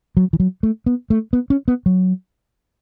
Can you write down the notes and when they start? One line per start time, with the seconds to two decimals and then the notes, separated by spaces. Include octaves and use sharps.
0.17 F#3
0.33 E3
0.40 F#3
0.63 A3
0.86 B3
1.10 A3
1.33 B3
1.50 C#4
1.68 B3
1.86 F#3